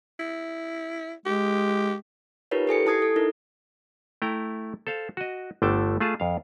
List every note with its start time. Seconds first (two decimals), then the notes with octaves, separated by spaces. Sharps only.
0.20 E4
1.26 G#3 G4
2.51 D#4 F4 G4 A#4 B4 C#5
2.67 G4 A4 G#5 C#7
2.86 E4 A5 D#6 G#6 C7
3.02 A4
3.16 D#4 E4 A#4
4.22 A3 E4 G5 A#5
4.87 A4 C5 F5
5.17 F#4 D#5
5.62 G1 D3 A3 G5 A5
6.00 A3 F4 G#4 A5
6.20 F2 F5